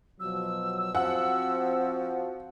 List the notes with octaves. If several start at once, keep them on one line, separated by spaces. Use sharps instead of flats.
B2 F3 F#3 E6
F3 C4 F#4 F#5